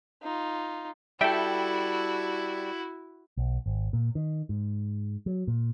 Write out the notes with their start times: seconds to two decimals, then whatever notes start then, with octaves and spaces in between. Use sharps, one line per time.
0.22 D#4 F4
1.21 G3 E4 F#4 A4 E5 G5
3.37 B1
3.66 G#1
3.93 A#2
4.15 D#3
4.49 G#2
5.26 F#3
5.47 A#2